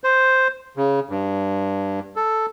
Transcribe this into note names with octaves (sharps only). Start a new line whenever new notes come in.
C5
C#3
G2
A4